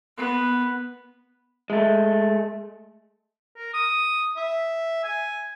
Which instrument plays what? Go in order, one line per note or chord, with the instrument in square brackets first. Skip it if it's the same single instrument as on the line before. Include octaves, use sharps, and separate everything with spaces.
[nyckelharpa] B3
[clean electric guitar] G#3 A3
[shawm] A#4
D#6
E5
G#5